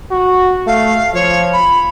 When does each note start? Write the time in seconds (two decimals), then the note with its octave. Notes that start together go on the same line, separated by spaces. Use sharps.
0.11 F#4
0.67 A3 F5
1.14 F3 C#5
1.53 B5